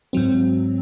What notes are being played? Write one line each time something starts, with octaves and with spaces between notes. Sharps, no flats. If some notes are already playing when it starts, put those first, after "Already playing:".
G#2 F#3 C4